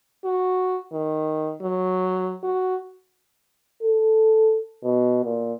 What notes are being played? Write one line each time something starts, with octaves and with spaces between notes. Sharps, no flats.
F#4
D#3
F#3
F#4
A4
B2
A#2